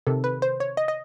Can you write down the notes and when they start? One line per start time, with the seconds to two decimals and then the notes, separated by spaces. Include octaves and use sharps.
0.07 C3 D#3 A4
0.24 B4
0.42 C5
0.60 C#5
0.77 D#5
0.88 D#5